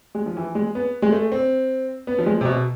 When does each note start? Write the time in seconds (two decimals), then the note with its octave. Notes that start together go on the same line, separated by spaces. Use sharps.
0.15 G#3
0.26 F3
0.37 E3
0.55 G#3
0.75 B3
1.02 G#3
1.12 A3
1.32 C4
2.07 B3
2.19 F3
2.26 G#3
2.41 C3
2.45 B2